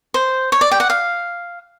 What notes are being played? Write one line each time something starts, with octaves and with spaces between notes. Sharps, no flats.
C5
C#5
D5
G5
F#5
F5